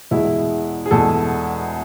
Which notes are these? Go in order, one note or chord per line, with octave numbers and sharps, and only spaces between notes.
E2 B2 G#3 E4
G#4
E2 B2 G#3 A4